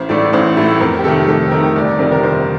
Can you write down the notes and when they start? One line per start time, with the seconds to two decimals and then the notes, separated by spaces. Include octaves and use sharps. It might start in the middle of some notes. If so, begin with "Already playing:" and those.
Already playing: A1 C5
0.09 A2 A3 D5
0.33 A1 C5
0.57 A2 A3
0.80 F2 A#4
0.99 G4
1.04 C3 D#3 A3 A4
1.28 F2 A4
1.51 C3 D#3 A3 A#4
1.75 G1 D5
1.99 F2 C3 D#3 G3 D5
2.12 A#4
2.23 G1 C5